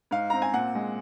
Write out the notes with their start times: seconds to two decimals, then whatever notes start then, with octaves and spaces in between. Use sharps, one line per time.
0.11 G#2 F5
0.30 C4 A#5
0.42 G#5
0.53 A#2 F#5
0.75 G#3